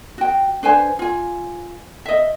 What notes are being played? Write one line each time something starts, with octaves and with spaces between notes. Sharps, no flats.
F#4 G5
D4 B4 C5 G#5
F4 G#5
D#5 E5